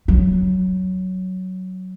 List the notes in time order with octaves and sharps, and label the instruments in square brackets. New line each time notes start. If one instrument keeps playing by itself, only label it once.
[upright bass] F#3